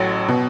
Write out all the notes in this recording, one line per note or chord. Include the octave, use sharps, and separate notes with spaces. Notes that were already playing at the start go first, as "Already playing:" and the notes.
Already playing: A1 A2 F#3
B2